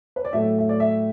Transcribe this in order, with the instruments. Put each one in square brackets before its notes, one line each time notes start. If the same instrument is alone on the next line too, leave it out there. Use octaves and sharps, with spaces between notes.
[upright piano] B4
D5
A2 F#3 A3 E5
E5
D5
E5